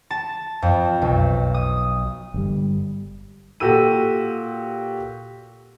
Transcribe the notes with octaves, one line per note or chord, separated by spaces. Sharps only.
A5
F2
B1
D#6
G1 G3
A#2 F#4 G4 A4 E6 D#7